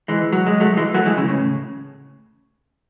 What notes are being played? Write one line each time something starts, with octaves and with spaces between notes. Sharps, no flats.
E3 G#3
F#3
G#3
F#3 A3
E3 G#3
F#3 A3
E3 G#3
C#3 E3
A2 C#3